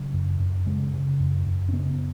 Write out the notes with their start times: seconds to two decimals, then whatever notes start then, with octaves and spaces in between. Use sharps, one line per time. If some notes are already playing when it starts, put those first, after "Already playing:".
Already playing: C#3 F#3
0.13 F#2
0.39 F#2
0.66 C#3 G#3
0.94 C#3
1.20 F#2
1.47 F#2
1.69 C#4
1.73 C#3 B3